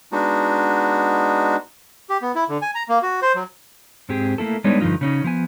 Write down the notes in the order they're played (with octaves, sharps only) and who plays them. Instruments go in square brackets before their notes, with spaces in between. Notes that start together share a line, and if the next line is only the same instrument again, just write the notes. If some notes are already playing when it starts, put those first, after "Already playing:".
[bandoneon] G#3 B3 D4 D#4 F#4
G4
B3
E4
D3
G#5
A#5
A#3
F#4
C5
F#3
[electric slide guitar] G#2 C4 G4 G#4
A3 A#3 E4 A4
G3 G#3 B3 D4 D#4 C#5
G2 D3 F3 D#4 F4
C#3 C#4 D#4
F3 B3 G#5